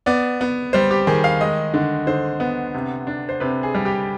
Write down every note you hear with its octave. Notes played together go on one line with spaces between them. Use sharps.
B3 D5
B3
G3 C5
G4
D#3 G#4
F5
G#3 D#5
D3
D3 C5
B3
C3
D4
C5
C3 B4
G#4
G3
G4